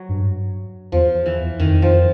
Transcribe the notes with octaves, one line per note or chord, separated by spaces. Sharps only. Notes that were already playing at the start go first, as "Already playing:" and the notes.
Already playing: F#3
G2
E2 F3
E3
F2 D#3
F3